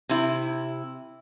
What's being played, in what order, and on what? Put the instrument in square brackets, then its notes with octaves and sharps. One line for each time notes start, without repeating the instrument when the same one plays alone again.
[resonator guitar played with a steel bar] C3 E4